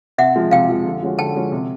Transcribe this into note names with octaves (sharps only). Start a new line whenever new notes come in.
C3 E5 F#5
F3 G#3
C3 F5 G5
F3 G#3
D3
F3 G#3 C#4 F#4
D3 G5 A5
F3 G#3 C#4 F#4
C3